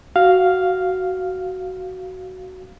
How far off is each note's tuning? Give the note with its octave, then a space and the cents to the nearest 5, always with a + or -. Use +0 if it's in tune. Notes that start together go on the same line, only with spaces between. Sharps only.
F#4 +10 F5 +0